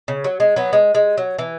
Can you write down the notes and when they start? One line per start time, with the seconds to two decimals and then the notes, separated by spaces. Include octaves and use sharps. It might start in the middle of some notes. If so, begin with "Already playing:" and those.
0.08 C#3
0.24 F#3
0.40 G#3
0.56 F#3 B3
0.73 G#3
0.95 G#3
1.17 F#3
1.39 E3